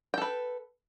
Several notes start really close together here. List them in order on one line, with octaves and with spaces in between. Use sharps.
G5 A4 B4